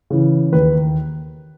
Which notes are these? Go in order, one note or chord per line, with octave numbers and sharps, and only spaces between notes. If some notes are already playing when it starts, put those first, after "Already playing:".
C#3 E3
D#2 B4